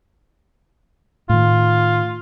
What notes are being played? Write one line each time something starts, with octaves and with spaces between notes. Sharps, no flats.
A2 D#3 F4